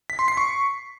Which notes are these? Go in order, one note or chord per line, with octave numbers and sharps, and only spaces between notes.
B6
C6
C7
C#6